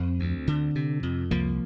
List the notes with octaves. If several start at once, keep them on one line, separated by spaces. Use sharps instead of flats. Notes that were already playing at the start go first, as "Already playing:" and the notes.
Already playing: F2 C4
D2
D3
C3
F2
C2 F3 A#3